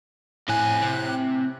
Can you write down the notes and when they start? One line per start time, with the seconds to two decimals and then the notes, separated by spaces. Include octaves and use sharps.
0.49 F2 A2 G#5 F#6
0.82 C3